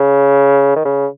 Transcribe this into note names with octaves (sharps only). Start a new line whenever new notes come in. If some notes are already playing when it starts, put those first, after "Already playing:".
Already playing: C#3
D#3
C#3